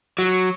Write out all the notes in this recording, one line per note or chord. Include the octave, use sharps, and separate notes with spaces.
F#3